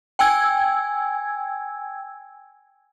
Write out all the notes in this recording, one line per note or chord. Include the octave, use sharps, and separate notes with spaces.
G5 G#5 E6 G#6